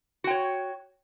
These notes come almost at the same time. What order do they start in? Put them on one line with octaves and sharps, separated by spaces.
F#4 G5 C#5